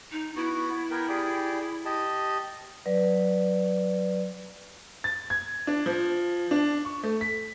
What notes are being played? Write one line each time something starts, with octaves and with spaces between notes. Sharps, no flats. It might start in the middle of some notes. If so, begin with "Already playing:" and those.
D#4
B3 E4 F#4
B3 A#4 G5
G4 G#4 D5
G4 D#5 A5
F#3 B4 D5
A6
G#6
D4
F3
D4
C#6
A3
B6